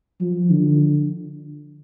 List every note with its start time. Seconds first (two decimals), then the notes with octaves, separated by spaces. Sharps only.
0.21 F3
0.50 D3